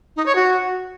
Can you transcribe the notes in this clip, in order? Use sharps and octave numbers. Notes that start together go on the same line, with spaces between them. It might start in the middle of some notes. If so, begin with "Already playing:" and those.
D#4
C#5
F#4